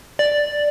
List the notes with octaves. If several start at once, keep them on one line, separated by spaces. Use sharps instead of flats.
D5